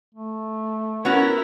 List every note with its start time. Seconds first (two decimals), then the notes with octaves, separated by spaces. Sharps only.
0.15 A3
1.05 B3 C#4 E4 F#4 A#4